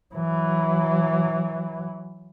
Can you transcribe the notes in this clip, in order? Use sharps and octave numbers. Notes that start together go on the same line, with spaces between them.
E3 F#3